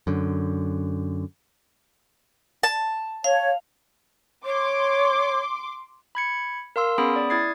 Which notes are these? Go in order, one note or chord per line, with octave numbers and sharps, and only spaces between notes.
F#2 D3
A5
C#5 F5
C#5 C6 D6
B5 G#6 C#7
A#4 F5 C6 E6
B3 C#4 G#4 B5 D#6 D7
D5
E4 D#6 G#6 A6 C7